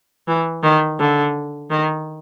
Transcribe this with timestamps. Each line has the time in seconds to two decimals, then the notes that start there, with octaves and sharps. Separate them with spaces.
0.28 E3
0.63 D#3
1.00 D3
1.71 D#3